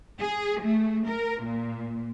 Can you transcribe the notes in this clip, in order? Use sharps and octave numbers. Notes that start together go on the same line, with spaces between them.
G#4
A3
A#4
A#2